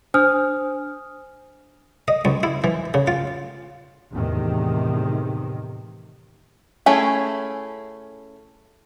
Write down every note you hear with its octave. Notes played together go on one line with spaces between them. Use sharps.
D4 C5 G#5 D#6 F6
D#5
C#2
E4
E3
C#3
F4
E2 A2 C3 D#3
A3 C#4 E4 G#4